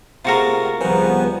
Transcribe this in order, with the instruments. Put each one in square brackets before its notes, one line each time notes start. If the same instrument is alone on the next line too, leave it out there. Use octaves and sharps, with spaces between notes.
[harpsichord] C3 G#3 A3 [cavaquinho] F4 F#4 A#4
[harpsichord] C#2 D#3 [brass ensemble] F3 G3 B3 [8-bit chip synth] B4 C5 G#5